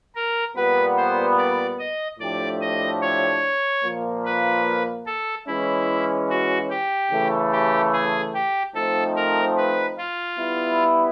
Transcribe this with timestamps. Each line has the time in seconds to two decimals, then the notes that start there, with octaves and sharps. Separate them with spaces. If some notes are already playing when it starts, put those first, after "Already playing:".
0.15 A#4
0.56 A#2 G3 B3 B4
0.97 C5
1.38 D5
1.79 D#5
2.20 A2 F3 A3 D4 G4 D5
2.61 D#5
3.01 C#5
3.83 A#2 F3 A#3
4.25 B4
5.06 A4
5.47 E3 G#3 C#4 E4
6.30 F#4
6.70 G4
7.11 C#3 E3 A3
7.52 G4
7.93 G#4
8.34 G4
8.74 F3 A3 C4 D#4 A4
9.16 A#4
9.57 B4
9.97 F4
10.38 G3 B3 E4